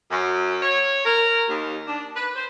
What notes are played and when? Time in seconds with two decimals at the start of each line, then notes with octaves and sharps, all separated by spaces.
0.10 F#2
0.61 C#5
1.05 A#4
1.48 D#2
1.86 D4
2.15 B4
2.35 C5